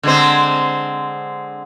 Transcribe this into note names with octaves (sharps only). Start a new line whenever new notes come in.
D3 G#3 C4